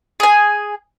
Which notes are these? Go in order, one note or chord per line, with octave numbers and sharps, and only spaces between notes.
G#4 G#5